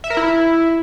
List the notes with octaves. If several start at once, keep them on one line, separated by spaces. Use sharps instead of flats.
E5
A#4
E4